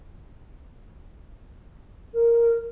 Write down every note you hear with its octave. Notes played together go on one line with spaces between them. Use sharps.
A#4